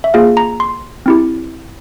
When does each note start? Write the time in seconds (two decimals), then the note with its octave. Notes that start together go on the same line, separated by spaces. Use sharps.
0.04 E5
0.14 A#3 F4 G#4 F5
0.37 A#5
0.60 C6
1.06 C4 E4 G4